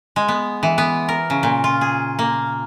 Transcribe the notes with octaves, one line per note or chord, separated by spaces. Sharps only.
G#3
B3
E3
B3
A#4
C#3
A#2
F4
G#4
A#3